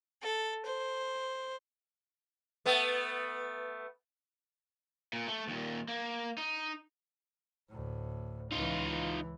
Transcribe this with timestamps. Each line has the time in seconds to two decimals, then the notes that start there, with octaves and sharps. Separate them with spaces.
0.22 A4
0.65 C5
2.66 A3 B3
5.13 A#2
5.28 A3
5.48 D#2 A#2
5.88 A#3
6.38 D#4
7.69 D2 A2
8.52 C#2 E3 D#4 F4